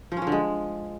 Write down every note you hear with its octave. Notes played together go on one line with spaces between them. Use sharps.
F3
C#4
F3
D3
G#3